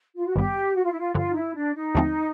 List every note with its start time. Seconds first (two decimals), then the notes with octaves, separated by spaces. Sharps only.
0.16 F4
0.26 F#4
0.35 G#1 G2 D#3 G3 B3 G4
0.75 F#4
0.83 F4
0.91 E4
0.99 F4
1.15 G2 D3 F3 F4
1.30 D#4
1.35 E4
1.55 D4
1.75 D#4
1.95 D#2 D3 F3 A3 C4